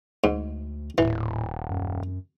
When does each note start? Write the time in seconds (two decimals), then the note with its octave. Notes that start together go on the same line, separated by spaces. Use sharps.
0.24 D2 G#2
0.98 D#1 A2 E3
1.70 F#2